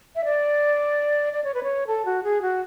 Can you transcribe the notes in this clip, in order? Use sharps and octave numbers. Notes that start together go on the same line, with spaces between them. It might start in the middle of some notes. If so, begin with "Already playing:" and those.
E5
D5
D5
C#5
B4
C#5
A4
F#4
G#4
F#4